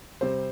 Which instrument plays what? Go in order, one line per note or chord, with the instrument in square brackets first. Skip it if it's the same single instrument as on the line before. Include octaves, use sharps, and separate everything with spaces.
[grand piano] C3 G3 C4 C5